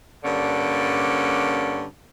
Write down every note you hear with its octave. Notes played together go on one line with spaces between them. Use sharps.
G2 D3 A#3 C#4